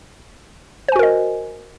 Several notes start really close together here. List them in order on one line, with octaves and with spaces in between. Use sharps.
C5 G#5 F#4 A#4 D#5